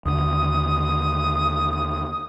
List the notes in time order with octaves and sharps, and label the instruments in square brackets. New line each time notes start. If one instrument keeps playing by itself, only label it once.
[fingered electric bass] D#2 D3 [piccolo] D#6